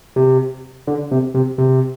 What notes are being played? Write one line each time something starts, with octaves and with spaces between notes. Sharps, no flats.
C3
D3
C3
C3
C3